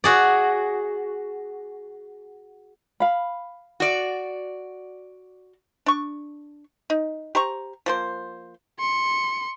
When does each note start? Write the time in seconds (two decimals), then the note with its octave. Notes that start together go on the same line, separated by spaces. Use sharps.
0.04 F#4 G#4 D5
3.00 F5 B5
3.80 F#4 D5
5.86 D4 C#6
6.90 D#4
7.35 G4 C5 A#5 C#6
7.86 F3 A#3 C5
8.80 C6 C#7